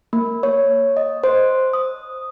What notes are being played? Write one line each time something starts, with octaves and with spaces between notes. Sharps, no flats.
A#3
C#5
D#5
C5
D#6